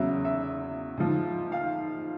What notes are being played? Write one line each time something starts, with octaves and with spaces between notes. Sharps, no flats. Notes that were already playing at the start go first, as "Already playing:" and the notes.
Already playing: E2 C#3 F#3 E5
E5
G#2 F3
F5